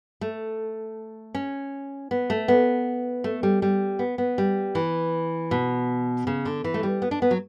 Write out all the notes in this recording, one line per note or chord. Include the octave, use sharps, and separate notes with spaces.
A3
C#4
B3
A3
B3
A3
G3
G3
B3
B3
G3
E3
B2
C#3
D3
E3
A3
G3
B3
D4
B3
F#3